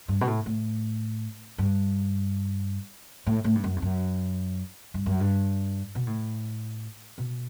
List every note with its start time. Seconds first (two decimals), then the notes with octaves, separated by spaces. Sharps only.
0.08 G2
0.21 B2
0.27 A2
0.46 A2
1.58 G2
3.27 A2
3.44 A2
3.55 G2
3.64 F#2
3.76 E2
3.82 F#2
4.94 G2
5.06 F#2
5.20 G2
5.95 B2
6.07 A2
7.18 B2